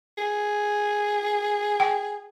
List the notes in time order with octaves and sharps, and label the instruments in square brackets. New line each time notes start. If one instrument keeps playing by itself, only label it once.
[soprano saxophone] G#4
[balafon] G5